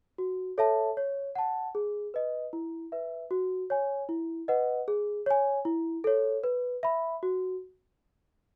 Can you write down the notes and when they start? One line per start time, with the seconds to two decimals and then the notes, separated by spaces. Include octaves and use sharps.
0.18 F#4
0.58 A4 C#5 E5 A5
0.97 C#5
1.35 F#5 A5
1.75 G#4
2.14 B4 D#5
2.53 E4
2.92 B4 E5
3.31 F#4
3.70 C#5 G#5
4.09 E4
4.48 B4 D#5 F#5
4.88 G#4
5.26 C#5 G#5
5.65 E4
6.04 A4 C#5
6.44 B4
6.83 E5 B5
7.23 F#4